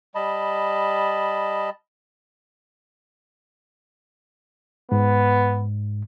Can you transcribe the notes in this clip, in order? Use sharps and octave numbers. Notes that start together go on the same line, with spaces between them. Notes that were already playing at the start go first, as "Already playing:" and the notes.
G3 D#5 A5 B5
G#2 B3